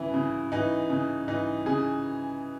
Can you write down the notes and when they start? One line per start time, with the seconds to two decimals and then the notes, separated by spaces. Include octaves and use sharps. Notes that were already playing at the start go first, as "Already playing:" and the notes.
Already playing: C#3 E3 E4
0.14 C#3
0.52 E3 D#4
0.90 C#3
1.28 E3 D#4
1.66 C#3 G#4